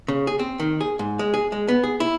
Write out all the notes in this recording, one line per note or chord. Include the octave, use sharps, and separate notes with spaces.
C#3
G#4
C4
D#3
G#4
G#2
G#3
G#4
G#3
B3
G#4
E4